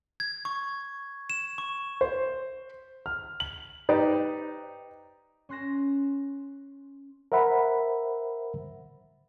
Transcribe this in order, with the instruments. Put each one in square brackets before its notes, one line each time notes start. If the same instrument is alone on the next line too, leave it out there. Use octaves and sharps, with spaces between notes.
[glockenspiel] G#6
C#6
E7
C#6
[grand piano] C5
F6
F#7
[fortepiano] D#4 G4 B4 C5 D5
[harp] C#4 C6 F#6 A#6 E7
[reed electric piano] A#4 C5 E5 F#5 B5